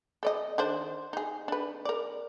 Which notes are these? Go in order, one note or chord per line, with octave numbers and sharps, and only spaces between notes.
A4 D5 D#5
D#3 D4 C5
D#4 G#4
D4 B4
A#4 D5